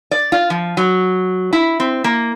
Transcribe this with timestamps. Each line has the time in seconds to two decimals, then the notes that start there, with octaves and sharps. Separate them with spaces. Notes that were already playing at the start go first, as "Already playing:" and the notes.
0.11 D5
0.32 F4
0.50 F3
0.77 F#3
1.53 E4
1.80 C4
2.04 A#3